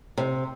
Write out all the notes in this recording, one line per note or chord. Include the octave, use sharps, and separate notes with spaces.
C3